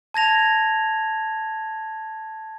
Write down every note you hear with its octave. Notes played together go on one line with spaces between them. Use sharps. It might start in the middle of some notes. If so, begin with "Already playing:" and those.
A5 G#6 A#6 F7